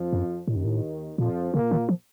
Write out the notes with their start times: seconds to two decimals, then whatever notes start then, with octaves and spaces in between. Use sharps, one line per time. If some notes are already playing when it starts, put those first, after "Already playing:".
Already playing: F2 F3
0.13 F#2
0.48 D#2 A2 D#3
0.56 F#2
0.65 A2
1.18 F2 A#2 F3
1.53 A#2 C#3 A#3
1.71 D#3
1.89 F3